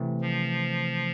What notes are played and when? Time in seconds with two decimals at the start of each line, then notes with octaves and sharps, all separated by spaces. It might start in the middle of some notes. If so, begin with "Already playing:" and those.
Already playing: C3 E3 A3 C4
0.21 F3